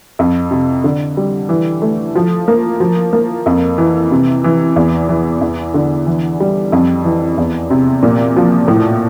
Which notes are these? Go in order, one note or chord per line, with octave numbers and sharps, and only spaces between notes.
F2
C3
D3
G3
E3
A3
F3
A#3
F3
A#3
F2
E3
C3
E3
E2
E3
E2
D3
E3
G3
F2
E3
E2
C3
A#2
F3
A2